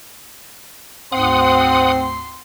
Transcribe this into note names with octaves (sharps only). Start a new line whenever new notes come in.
D2 G#2 C4 F#5 C6 D#6